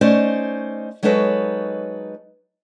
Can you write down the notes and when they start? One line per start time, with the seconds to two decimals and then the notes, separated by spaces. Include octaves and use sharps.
0.01 A3 C#4 D#4 C5 D5
1.03 F#3 G#3 D#4 A4 B4 C#5